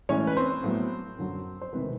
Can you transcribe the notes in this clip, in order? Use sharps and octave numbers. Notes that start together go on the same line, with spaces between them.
A2 E3 G#3 C#4 C#5
B4
C4 C5
A2 F#3 B3
F#2 D3 F#3
C5
E1 C3 D#3 B4